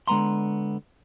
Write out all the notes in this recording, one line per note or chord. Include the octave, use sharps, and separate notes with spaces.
D3 G#3 B3 A#5 C6